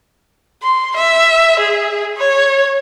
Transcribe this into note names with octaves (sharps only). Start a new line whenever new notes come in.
C6
E5
G#4
C#5